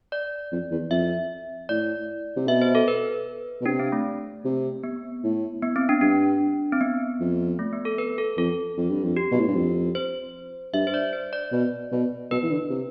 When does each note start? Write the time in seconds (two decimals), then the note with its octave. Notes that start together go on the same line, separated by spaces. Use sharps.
0.12 D5
0.52 F2
0.71 E2
0.90 F2 E5
1.69 A2 D5
2.37 C3
2.48 B2 E5
2.62 C5
2.75 A4
2.88 B4
3.61 B2
3.66 C3 D4
3.79 C4
3.92 A3
4.45 C3
4.83 B3
5.24 A2
5.62 B3
5.76 C4
5.89 D4
6.01 G2 D4
6.73 C4
6.81 B3
7.20 F2
7.59 A3
7.73 B3
7.85 A4
7.98 B4
8.18 A4
8.38 F2 A4
8.77 F2
8.90 G2
9.04 F2
9.17 G4
9.32 B2
9.40 A2
9.48 G2
9.55 F2
9.95 C5
10.74 G2 E5
10.87 C5
10.94 D5
11.13 C5
11.33 D5
11.52 B2
11.92 B2
12.31 B2 B4
12.43 E3
12.51 D3
12.70 C3